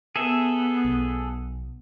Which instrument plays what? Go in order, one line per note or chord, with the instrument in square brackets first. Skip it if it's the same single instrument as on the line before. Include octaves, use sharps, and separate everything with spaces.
[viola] B3 [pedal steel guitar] G#4 A4 E5
[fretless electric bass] B1